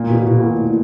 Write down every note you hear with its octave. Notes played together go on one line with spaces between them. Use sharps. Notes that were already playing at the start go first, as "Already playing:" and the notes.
Already playing: A#2
B2
B2
A#2
A2
A#2